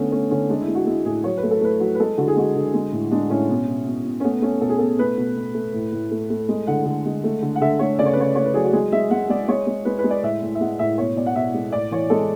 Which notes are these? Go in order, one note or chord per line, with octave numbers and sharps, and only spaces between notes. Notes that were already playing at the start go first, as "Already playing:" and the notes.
Already playing: D3 A3 B3 C#4
A3 C#4
D3 C#4
G#3 D4
E4
G#3
F#4
G#3 E4
A2 G#4
F#3 C#5
B4
A3
A4
A3 B4
F#3
B4
G#3 A4
D3 F#4
G#4
G#3 F#4
D3
G#3
A2
G#3 D4
A2 C#4
B2
B2
B2
B2
C#4
A3 B3
A3 C#4
B2 A4
G#4
B2 A4
A3 B4
B2
B2
A3
A2
A2
A3
A3
G#3
D3 F#5
D3
G#3
A3
D3
F#5
D3 E5
A3 C#5
C#3 D5
C#5
B4
C#3 C#5
A3 C#5
B4
F#3 G#4
F#4
G#3 G#4
G#3 E5
G#3 F#5
G#3 D5
G#3 C#5
G#3
G#3 B4
B4
G#3
D5
A2 E5
A2
E5
G#3 F#5
A2 E5
B2 C#5
B2 D5
F#5
B2 E5
G#3
A2 D5
E3 C#5
G#3 A4